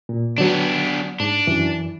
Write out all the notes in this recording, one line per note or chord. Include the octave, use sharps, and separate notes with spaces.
A#2
D3 F#3 B3 D4
G#2 D4
F#2 E3